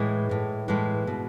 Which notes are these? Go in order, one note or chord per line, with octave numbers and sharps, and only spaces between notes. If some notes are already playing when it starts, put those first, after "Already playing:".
Already playing: A2 E3 G#3
A2 E3
A2 E3 G#3
B2